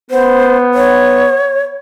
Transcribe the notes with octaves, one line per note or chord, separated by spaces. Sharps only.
B3 C5
C#5